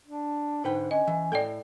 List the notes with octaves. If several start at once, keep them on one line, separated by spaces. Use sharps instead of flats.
D4
G#2 D3 B4 G5
C#4 D#5
E3
A2 A4 D5 G5